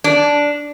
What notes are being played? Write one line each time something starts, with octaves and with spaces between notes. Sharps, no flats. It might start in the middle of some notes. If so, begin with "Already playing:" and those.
D4